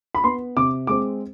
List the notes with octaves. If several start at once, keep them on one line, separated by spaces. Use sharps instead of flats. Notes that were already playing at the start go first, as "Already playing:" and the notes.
B5
B3 C6
C3 D6
G#3 C4 D6